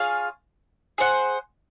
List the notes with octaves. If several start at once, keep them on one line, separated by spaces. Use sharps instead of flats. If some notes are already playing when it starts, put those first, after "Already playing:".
Already playing: F4 G#4 C#5 F5
G#4 C5 F#5